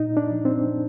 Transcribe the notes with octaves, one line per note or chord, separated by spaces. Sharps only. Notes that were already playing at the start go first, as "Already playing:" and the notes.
Already playing: A#2 D#4
D4
F3
C4